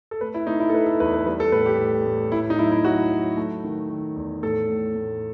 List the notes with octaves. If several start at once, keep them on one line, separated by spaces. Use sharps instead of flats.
A4
A3 B4
E4
A3 D#4
E4
A4
A3 B4
A4
E2 B4
B4
G3 B4
A4
A2 B4
G4
A2
A2
A2 E4
D#4
F#3 E4
E4
F#3 F#4
F#3
A3
D#3
D#3
E2
A2 A4
A2
A2